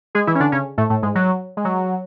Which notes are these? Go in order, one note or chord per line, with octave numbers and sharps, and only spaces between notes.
G#3 G#4
E3 E4
C#4
D3 D4
C#3 C#4
A2 A3
A2 A3
G#2 G#3
F#3
G#3
F#3